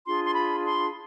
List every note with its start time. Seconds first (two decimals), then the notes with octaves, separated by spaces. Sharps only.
0.06 D4 F4 G#4 C6
0.26 C6
0.35 B5
0.65 C6